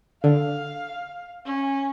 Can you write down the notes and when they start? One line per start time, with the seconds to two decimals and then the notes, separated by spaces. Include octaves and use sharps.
0.24 D3 F5
1.46 C#4